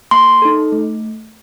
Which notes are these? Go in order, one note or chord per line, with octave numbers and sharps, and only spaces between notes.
A#3 C6
D#4 A4
A3